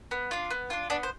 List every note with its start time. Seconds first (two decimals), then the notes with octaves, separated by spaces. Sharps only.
0.11 B3
0.31 D4 F4
0.51 B3
0.70 D4 F4
0.90 B3 D4 D5
1.03 C5